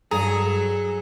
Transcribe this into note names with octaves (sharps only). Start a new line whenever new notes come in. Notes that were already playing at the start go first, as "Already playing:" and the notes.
G2 F#3 G#4 A4 A#5